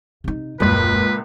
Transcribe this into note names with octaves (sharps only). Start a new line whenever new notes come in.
C3 D#4
D#1 C#2 F#2 A#2 B4